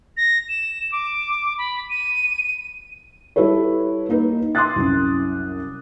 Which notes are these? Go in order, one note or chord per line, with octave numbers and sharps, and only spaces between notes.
A#6
E7
D6
B5
D#7
G3 E4 A4 B4 C#5
A#3 D#4 B4
C6 D6 D#6 F#6 A6
C2 F#2